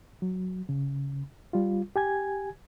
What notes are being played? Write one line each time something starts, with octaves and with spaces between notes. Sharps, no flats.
F#3
C#3
G3 F4
G4 G#5 G#6